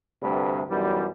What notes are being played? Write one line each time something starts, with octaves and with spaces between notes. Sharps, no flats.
D2 G2 C3 A3 B4
B1 F#2 E3 G3